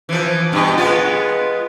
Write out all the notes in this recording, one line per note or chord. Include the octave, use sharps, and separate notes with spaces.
E3 F3
G2 B2
G#3 B3 F4